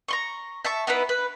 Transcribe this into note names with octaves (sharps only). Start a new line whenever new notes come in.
A#5 C6 C#6
E5 A5 C#6
B3 D#4 E4 B4
B4